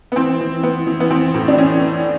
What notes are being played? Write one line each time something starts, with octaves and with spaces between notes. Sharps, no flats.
B3
E3 C4
E3
E3 B3
E3
B3
E3 C4
A2
D4
E3 C#4
E3